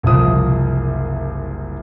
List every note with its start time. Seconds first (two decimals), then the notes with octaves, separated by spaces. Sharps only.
0.03 F#1 C2 F3 D#6